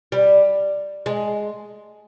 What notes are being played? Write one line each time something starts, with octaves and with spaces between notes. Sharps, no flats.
G3
G#3